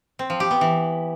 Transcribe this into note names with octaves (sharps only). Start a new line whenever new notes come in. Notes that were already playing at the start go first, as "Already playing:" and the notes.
C4
F3
G4
B3
E3